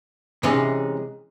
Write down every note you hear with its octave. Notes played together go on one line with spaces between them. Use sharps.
C3 E3 G#3 C#4 D#4